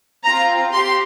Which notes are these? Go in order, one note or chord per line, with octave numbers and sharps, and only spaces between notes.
C4 F4 A#5
G4 C6